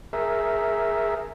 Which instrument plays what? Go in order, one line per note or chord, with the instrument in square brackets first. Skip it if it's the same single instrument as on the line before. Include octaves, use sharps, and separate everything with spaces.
[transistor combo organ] G#4 A#4 E5